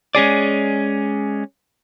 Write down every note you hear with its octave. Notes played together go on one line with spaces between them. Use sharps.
G#3 C#4 G#4 D5